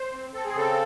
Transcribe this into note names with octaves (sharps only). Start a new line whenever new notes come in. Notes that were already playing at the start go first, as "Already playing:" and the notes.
Already playing: C5
C4
C4 A4
G#4
C#3 A4